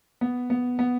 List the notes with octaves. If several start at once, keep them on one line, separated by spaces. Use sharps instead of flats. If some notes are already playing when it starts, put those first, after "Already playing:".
B3
B3
B3